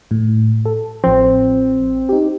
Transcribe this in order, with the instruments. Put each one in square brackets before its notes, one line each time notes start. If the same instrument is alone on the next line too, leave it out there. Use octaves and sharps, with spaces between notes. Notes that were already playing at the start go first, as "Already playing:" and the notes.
[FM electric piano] A2
A4
[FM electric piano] A1 F3 [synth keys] C4
[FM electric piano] D#4 G4